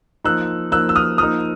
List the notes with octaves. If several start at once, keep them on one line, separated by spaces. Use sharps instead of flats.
F3 A#3 D#4 E6 F#6
F3 A#3 D#4 E6 F#6
E6
D#6 F6
F3 A#3 D#4 D#6 F6